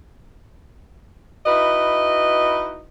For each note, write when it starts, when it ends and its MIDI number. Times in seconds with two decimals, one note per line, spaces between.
1.46 2.84 63
1.46 2.84 64
1.46 2.84 66
1.46 2.84 71
1.46 2.84 75